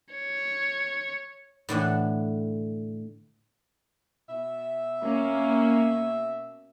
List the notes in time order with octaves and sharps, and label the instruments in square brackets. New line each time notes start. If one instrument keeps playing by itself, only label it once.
[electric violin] C#5
[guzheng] A2 D3 E3 F#5
[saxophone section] B2 E5
[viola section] A#3 C#4